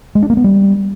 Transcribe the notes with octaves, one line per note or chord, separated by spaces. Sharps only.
G#3
D4
A#3
B3
G3